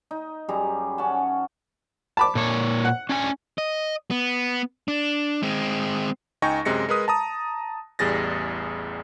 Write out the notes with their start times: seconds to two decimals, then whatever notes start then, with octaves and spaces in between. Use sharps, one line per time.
0.11 D#4
0.49 F#2 G3 G#4 A#5
0.98 C#4 F#5 A5
2.17 A5 B5 D6
2.35 A#2 C#5
2.85 F#5
3.09 C#4 D4 G#5
3.58 D#5
4.10 B3
4.88 D4
5.43 G#3 C4
6.42 C#2 D#4 G5 G#5 C#6 A#6
6.65 F#2 C3 G#3 A#6 C#7
6.89 G#3 A#4 B4 D#6
7.08 A5 A#5 D#6
7.99 A1 E2 G3 G#4 A6 A#6